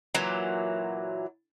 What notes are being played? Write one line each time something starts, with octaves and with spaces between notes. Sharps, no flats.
A#2 E3 F#3